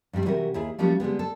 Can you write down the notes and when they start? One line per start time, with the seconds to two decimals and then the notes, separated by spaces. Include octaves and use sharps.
0.13 G2 D#3 G3 C4
0.25 C3 E3 F#4 G4 A4 A#4
0.54 D#2 E4 G#4
0.78 F3 G3 A3 A#3 C#4 F#4
1.00 D3 G3 G#3 B3
1.19 A4